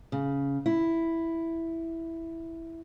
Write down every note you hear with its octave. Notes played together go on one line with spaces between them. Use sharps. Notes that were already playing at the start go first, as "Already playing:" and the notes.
C#3
E4